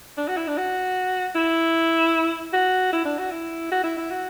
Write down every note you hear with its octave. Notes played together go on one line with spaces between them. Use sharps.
D4
F#4
E4
D4
F#4
E4
F#4
E4
D4
F#4
E4
F#4
E4
E4
F#4